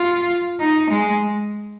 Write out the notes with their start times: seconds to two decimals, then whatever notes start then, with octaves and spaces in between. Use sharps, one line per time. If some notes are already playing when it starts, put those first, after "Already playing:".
Already playing: F4
0.60 D#4
0.90 G#3